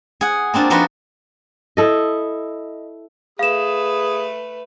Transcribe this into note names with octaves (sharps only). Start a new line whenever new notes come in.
G#4 F#5
A#3 C4 D4 F4
F3 D4 D#4 F#4 B4 C5
E4 A4 D#5
A3 G#4 B4 F5 E7